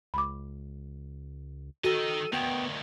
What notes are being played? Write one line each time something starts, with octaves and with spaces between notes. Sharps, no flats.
C#2 B5 D6
D#3 F#4 A4 D#5
D2 D#3 B3 G5